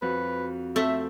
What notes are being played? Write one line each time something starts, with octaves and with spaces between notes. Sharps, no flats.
F2 F#4 B4
A3 C4 E5